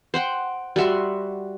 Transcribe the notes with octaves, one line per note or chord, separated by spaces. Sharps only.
C5 F#5 G5
G3 F#4 E5 C6